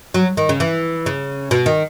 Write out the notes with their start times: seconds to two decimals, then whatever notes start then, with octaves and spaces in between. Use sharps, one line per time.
0.14 F#3
0.37 D#3
0.49 C#3
0.60 E3
1.06 C#3
1.51 B2
1.66 D#3